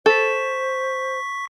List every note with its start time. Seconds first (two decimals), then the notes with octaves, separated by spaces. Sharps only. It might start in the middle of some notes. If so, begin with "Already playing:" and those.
0.06 A4 C5 C#6 B6